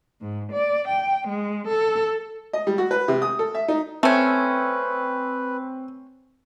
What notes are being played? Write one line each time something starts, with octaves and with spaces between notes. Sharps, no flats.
G#2
D5
G5
G#3
A4
D#5
G3
F#4
B4
C3
D#6
A4
E5
D#4
A3 C4 C#4 B4